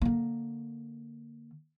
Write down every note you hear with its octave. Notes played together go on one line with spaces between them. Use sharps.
D3 A#3